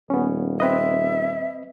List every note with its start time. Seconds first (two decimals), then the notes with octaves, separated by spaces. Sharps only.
0.10 D#1 B3 C#4
0.60 C4 B4 D#5 E5